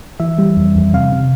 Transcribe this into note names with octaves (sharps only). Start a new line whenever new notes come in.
E3 E5
G3
F2
F2
C3 F5
C3